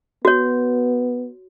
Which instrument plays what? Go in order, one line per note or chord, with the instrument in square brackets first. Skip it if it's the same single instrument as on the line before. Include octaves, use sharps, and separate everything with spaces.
[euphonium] B3 [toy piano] F#4 C#5